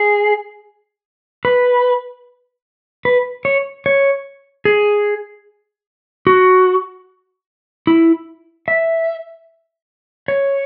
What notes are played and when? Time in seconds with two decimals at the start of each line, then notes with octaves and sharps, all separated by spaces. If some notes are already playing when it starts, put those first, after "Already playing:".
Already playing: G#4
1.45 B4
3.05 B4
3.45 C#5
3.86 C#5
4.65 G#4
6.27 F#4
7.87 E4
8.68 E5
10.28 C#5